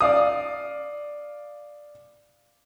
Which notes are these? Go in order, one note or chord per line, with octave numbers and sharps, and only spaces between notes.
D5 F5 D#6